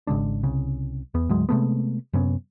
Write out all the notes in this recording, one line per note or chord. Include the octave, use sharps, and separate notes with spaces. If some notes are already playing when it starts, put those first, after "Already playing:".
G#1 C#3 G#3 D4
C2 C#3
E2 B3
D2 G#2 F#3 G#3
C3 G#3 A3 B3
F#2 C3 B3 C#4